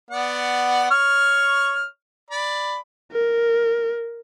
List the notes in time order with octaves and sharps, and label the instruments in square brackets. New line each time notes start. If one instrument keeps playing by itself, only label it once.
[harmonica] B3 D5 F#5
C#5 C#6 F6
D5 B5
[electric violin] A#4